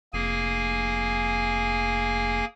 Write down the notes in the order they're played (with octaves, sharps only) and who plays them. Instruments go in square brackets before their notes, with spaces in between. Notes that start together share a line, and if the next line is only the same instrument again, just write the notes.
[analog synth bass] F1 [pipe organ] A#3 G#4 G#5